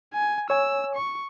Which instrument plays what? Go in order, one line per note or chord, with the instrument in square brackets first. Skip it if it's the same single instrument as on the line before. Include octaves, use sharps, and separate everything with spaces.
[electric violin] G#5
[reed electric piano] C#5 G#5 [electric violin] E6
[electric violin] C#6